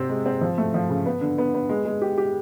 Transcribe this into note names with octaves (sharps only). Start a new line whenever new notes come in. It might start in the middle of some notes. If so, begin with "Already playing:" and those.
Already playing: C3 C4
G#3
C4
F3
A3
F3
C#3
B3
D3
B3
B3
G#3
G#3
G4
G4